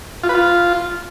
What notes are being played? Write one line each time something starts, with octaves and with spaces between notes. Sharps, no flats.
F4
B4
F4